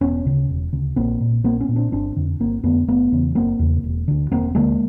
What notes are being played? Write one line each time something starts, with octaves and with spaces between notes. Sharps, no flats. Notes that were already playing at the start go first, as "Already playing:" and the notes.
E1 B3 C#4
D2 C#3
E1
D2 C#3
A#1 A#3 C4
A#2
A#1 A#3 C4
B3 C#4
A#2
C4 D4
G1 C4 D4
F2 D3
G1 A#3 C4
F2 D3 A3 B3
F#1 A3 B3
E2 C#3
F#1 A#3 C4
E2 C#3
E1
D2 D3
E1 A#3 C4
D2 D3 G#3 A#3